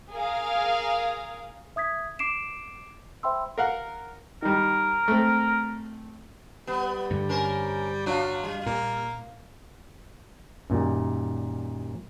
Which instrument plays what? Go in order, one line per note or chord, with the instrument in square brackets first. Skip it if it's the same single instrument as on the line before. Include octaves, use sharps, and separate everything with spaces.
[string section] G#4 A#4 F5
[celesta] E5 D#6 G#6 B6
D6 C7 D7 E7
C5 E5 G5 B5 C6 E6
[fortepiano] A#4 F5 F#5
[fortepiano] D#3 G3 [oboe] A#4
[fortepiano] A3 C4
[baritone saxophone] G3 [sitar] B3
[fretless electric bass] G2 D3
[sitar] C#4 A#4 C5
[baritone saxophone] F#3 [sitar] D4 F4
[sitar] G3
[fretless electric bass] A#2 [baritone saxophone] A#3
[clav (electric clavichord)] F#2 A#2 D#3 G3